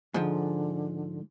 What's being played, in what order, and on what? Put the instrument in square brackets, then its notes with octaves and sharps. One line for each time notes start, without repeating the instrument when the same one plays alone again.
[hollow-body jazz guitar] G#2 F3 [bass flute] D3